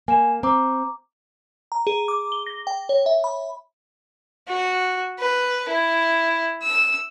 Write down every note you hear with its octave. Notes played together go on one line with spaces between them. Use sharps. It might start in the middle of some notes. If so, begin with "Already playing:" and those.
A#3 G#5 E7
C4 A#5 D6
A#5
G#4
D6
G7
A#6
G5
C#5
E5
B5
F#4
B4
E4
E6